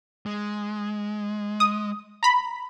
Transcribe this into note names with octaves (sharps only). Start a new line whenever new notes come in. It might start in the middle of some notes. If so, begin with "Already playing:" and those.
G#3
D#6
A#5 B5